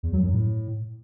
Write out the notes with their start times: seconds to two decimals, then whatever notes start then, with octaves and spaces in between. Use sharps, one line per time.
0.03 E2
0.13 F#3
0.23 F#2
0.33 A2